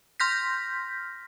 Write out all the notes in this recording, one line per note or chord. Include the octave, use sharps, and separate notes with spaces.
C6 F6 G6 A#6 B6